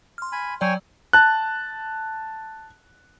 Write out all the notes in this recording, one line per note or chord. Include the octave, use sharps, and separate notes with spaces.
C6 F6
G#5 B5
F#3 C#5 D5 G5 G#5
A5 F#6